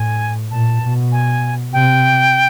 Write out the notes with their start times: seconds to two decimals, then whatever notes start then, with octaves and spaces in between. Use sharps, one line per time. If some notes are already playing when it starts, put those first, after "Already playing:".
Already playing: A2 G#5
0.50 A#2 A5
0.81 B2
1.12 G#5
1.73 C3 G5